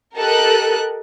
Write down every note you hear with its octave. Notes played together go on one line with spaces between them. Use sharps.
G4 A4 A#4 D#5 F#6